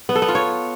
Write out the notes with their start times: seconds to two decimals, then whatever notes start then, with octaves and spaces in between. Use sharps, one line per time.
0.09 B3
0.15 A4
0.22 B3
0.28 F4
0.35 C#5